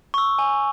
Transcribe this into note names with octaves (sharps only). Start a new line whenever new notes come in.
C#6 E6
G#5